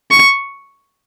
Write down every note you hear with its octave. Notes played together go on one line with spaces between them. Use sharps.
C#6